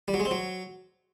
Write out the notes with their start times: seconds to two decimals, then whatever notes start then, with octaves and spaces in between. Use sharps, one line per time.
0.08 G3
0.14 F#3
0.20 G#3
0.25 C4
0.31 F#3